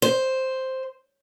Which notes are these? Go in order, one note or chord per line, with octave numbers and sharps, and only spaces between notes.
C5